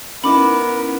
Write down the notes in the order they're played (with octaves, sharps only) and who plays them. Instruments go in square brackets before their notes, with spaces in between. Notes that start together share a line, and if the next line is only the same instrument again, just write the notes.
[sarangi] B3 [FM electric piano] C#4 D#4 E4 [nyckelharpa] A#4 [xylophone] B5 D6